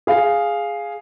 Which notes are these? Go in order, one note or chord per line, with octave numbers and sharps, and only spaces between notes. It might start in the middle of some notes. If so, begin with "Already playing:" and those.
G#4 F5